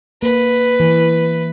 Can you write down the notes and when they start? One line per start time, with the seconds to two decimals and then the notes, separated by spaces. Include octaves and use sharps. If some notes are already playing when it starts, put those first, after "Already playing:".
0.22 A#3 B4
0.80 E3